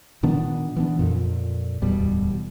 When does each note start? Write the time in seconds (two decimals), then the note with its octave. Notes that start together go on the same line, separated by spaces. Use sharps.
0.23 A#2 D#3 B3 D4
0.77 E3 B3 D4
0.99 F2 A#2
1.82 D1 E2 B2 G3